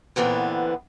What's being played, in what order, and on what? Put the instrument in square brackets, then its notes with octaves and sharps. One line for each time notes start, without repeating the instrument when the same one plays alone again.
[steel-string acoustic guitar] A#2 D3 E3 B3 C4